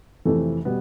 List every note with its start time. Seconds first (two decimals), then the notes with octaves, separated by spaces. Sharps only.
0.25 F2 C3 E3 A3
0.65 B2 G3 B3